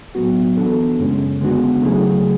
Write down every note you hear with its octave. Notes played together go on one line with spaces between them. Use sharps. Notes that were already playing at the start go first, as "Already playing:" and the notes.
A2 F#3 B3 F#4
E3 B3 D4 A4
F#2 C#3 G#3 C#4
D3 G#3 B3 D4 F#4
C#3 F#3 A3 E4 G#4